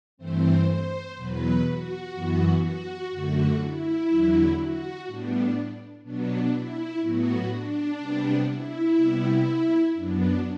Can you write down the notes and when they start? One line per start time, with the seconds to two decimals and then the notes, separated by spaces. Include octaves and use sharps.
0.17 G2 E3 A3 C4 C5
0.67 C5
1.16 E2 B2 F#3 B4
1.64 F#4
2.14 F#2 E3 B3
2.63 F#4
3.11 F#2 D3 A3 F#4
3.60 E4
4.08 E2 D3 F#3
4.57 F#4
5.07 A2 G3 B3 D4
6.03 B2 F#3 B3 D4
6.52 E4
7.01 A2 F#3 B3 F#4
7.50 D4
8.00 C3 G3 B3
8.48 E4
8.96 C3 G3 B3
9.94 F#2 F#3 B3 D4